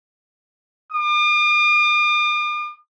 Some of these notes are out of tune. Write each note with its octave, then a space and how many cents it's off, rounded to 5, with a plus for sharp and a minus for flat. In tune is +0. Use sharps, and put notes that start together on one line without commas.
D6 +45